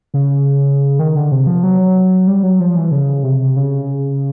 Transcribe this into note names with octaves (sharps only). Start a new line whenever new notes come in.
C#3
D#3
D3
C3
F3
F#3
G3
F#3
F3
E3
C#3
C3
C#3